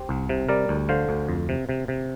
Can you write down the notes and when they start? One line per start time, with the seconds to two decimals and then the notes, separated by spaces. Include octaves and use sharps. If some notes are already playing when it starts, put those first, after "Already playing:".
Already playing: G4 C5
0.09 C2
0.29 C3
0.49 G3 A#4 D5
0.69 D2
0.89 D3 C5 F5
1.09 D2
1.29 F2
1.49 C3
1.69 C3
1.88 C3